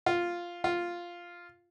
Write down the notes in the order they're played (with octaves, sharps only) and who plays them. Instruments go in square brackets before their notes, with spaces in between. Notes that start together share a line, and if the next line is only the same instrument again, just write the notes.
[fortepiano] F4
F4